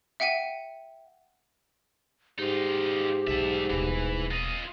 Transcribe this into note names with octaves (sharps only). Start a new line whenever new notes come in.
E5 F#5 G5 C#7 D#7
G#2 D#4 F4 G4
B1 D4 E5
D#1 B2 E3
F4 D#5